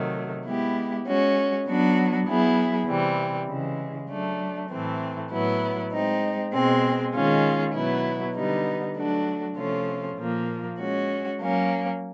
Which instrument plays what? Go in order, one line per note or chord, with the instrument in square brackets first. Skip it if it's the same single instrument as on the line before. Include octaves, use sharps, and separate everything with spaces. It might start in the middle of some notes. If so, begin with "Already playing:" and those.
Already playing: [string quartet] C3 D#3 F#3 A3
G#3 B3 E4 G4
G#3 C#4 F#4
F#3 B3 D4 F#4
F#3 B3 E4 G#4
C3 E3 G3 C4
C#3 E3 G#3
F#3 A3 D4
A2 E3 A3 C4
A2 F#3 B3 E4
G#3 C4 D#4
B2 G#3 C4
D#3 G#3 C#4 F4 G#4
B2 F#3 B3 E4
D3 G3 B3 D#4
F#3 A3 D4 F#4
C3 F3 A3 C#4 F4
A#2 F3 A#3
G#3 C#4 F#4
F#3 A#3 C#4